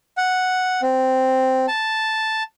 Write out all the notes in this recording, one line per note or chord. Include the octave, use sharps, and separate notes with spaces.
F#5
C4
A5